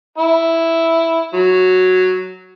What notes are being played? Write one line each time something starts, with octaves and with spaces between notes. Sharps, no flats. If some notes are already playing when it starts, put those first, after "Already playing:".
E4
F#3